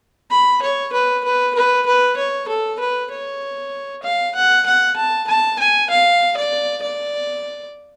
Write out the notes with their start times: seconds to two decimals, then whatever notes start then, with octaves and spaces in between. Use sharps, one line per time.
0.30 B5
0.62 C#5
0.92 B4
1.24 B4
1.54 B4
1.86 B4
2.17 C#5
2.48 A4
2.79 B4
3.11 C#5
4.03 F5
4.35 F#5
4.66 F#5
4.96 A5
5.27 A5
5.59 G#5
5.90 F5
6.37 D5
6.82 D5